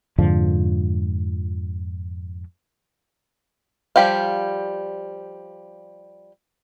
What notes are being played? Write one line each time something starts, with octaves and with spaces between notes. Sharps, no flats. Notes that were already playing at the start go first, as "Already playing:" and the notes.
F2 G#2 D3 F3
F3 G3 G4 F5